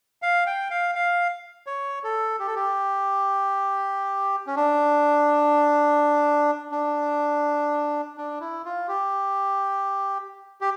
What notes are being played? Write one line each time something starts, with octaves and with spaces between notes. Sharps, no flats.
F5
G5
F5
F5
C#5
A4
G4
A4
G4
C#4
D4
D4
D4
E4
F4
G4
G4